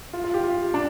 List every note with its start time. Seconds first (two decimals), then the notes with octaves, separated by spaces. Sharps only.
0.13 F4
0.24 F4
0.34 G4
0.43 F4
0.74 D4